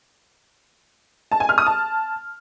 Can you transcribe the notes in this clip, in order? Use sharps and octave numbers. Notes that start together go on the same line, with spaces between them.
A5
G#5
F6
D#6
A5